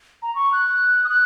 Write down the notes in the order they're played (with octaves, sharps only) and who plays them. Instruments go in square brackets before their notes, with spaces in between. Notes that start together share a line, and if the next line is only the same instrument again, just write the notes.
[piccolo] A#5
C#6
F#6
D#6
F#6